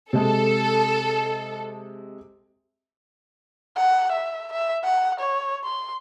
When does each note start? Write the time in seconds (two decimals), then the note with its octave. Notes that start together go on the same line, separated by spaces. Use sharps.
0.13 C3 G#3 A4
3.76 F#5
4.12 E5
4.53 E5
4.84 F#5
5.20 C#5
5.64 C6